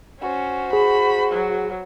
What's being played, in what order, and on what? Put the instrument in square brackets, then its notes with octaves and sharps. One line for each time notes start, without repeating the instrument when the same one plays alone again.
[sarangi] C#4 [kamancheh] F#4 C5
[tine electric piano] G#4 [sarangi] B5
[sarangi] F#3